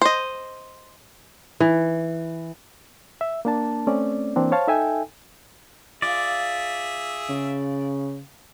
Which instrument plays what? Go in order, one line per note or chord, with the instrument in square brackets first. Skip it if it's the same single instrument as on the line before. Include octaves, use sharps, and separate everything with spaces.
[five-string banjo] C5 D#5
[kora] E3
[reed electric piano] E5
A#3 D4 A5
A3 C4 C#4 D5
E3 A#3 C4 D4
C5 C#5 F5 A5
D#4 A4 E5 G5 G#5
[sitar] F4 [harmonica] G#4 E5 [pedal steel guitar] D5
[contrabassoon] C#3